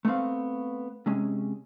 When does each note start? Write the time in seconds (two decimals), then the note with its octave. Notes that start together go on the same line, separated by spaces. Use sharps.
0.05 A3 B3 C4 F5
1.06 C3 G#3 C#4